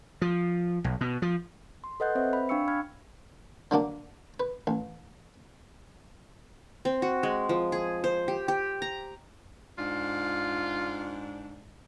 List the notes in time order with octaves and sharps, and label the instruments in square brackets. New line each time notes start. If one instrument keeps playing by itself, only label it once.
[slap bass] F3
B1
B2
F3
[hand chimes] C6
A4 B4 D#5 F#5 F#6 G6
C4 B4 C5 E5
B5
D4 F5 G5 C#6 E6 C#7
B5 F6 G#6
[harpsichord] D3 F#3 A#3 D4
B4
A1
[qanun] C4
F#4
G#3
F3
G#4
C5
G4
G4
A#5
[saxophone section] G#2 D4 [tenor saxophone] F4